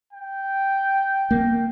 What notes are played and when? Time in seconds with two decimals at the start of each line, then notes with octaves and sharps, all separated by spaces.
0.13 G5
1.31 A#3